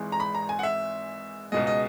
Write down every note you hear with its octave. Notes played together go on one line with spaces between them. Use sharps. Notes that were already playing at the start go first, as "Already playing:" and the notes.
Already playing: G#1 G#2 E3 G#3
A#5
B5
A#5
G#5
F#5
E5
C#2 B2 G#3 D#5
D#5